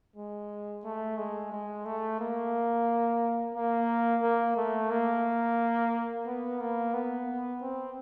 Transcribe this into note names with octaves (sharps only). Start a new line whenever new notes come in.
G#3
A3
G#3
G#3
A3
A#3
A#3
A#3
A3
A#3
B3
A#3
B3
C4